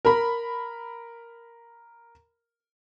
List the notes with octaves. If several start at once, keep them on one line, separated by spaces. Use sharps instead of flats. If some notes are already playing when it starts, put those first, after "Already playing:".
A#4 B5